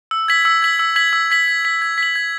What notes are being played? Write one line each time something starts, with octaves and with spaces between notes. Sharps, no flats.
E6
G#6 B6 F#7
E6
G#6 B6 F#7
E6
G#6 B6 F#7
E6
G#6 B6 F#7
G#6
B6 F#7
G#6
B6 F#7
G#6